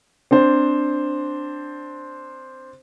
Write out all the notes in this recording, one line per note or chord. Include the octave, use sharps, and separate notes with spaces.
C4 D4 C5